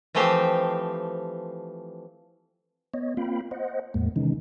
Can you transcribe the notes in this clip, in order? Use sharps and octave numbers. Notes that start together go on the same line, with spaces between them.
E3 F3 A3 C4 G4 C5
B3 C#5 D#5
A#3 C4 F4 F5 G5 B5
C5 D#5 F#5
E2 A2 G#3 A#3
C3 D#3 E3 G#3 C#4 D#4